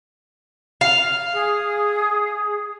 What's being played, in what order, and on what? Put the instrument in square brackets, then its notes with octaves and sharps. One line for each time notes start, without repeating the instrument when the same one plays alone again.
[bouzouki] F5
[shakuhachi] G#4